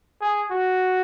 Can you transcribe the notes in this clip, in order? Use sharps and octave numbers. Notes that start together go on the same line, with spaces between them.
G#4
F#4